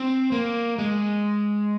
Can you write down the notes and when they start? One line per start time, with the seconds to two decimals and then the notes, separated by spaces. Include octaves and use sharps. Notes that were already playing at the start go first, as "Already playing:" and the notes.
Already playing: C4
0.32 A#3
0.78 G#3